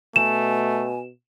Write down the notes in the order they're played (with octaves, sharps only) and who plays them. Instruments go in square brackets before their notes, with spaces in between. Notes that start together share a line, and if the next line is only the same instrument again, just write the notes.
[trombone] B2 [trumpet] A3 [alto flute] G#5 [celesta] E7